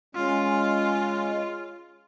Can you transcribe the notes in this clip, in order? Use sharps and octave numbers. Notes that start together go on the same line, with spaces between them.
G#3 C#4 F4